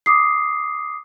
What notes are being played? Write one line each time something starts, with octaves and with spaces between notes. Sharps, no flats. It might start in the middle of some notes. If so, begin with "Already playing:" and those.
D6 D#6 C7